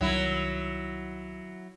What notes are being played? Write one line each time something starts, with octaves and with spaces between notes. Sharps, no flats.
C2 D#3 F#3 E4